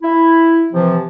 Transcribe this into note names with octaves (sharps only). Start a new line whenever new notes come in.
E4
C3 E3 F3